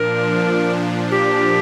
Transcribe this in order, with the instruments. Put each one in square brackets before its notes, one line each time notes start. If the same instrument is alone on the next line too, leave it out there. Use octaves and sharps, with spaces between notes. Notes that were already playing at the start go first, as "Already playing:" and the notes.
Already playing: [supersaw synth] A#2 F3 D4 [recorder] A#4
[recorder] G4